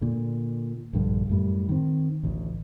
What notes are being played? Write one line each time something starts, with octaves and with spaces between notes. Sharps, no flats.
A#2 D3
A#1 G2 D3
F#2 A2 G3
D#3 C4
A1 D2